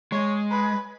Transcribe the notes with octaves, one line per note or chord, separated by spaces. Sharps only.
G#3 C#5
B4